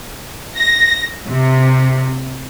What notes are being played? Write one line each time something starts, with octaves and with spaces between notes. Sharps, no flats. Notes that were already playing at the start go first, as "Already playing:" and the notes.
A#6
C3